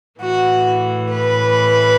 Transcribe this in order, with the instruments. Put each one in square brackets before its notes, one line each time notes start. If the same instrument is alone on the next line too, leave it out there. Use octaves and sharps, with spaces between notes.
[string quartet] A2 E3 F#4
B4